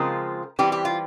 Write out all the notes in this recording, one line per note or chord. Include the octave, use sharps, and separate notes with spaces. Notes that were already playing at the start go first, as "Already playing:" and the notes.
Already playing: C#3 F3 G#3 C4 F4 A#4
E3 G3 C4 G4
G4
F4